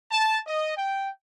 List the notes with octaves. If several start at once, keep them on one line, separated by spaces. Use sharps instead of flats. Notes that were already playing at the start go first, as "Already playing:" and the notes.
A5
D#5
G5